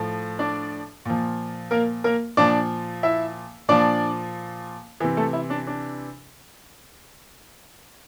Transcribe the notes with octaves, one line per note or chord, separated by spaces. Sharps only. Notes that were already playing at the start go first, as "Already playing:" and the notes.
Already playing: A2 F3
D4 D5
A#2 F3
A#3 A#4
A#3 A#4
A#2 F3 D4 D5
E4 E5
A#2 F3 D4 D5
C3 E3
A3 A4
E4
D4
D4